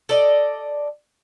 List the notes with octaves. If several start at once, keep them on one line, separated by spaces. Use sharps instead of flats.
A4 D5 D#5